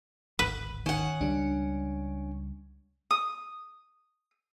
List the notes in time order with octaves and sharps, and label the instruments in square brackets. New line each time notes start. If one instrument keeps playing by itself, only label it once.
[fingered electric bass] D1 G#1 [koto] B4
[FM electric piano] D#3 [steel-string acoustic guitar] C#4 F#5
[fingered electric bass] C#2 G3 [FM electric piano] D4
[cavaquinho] D#6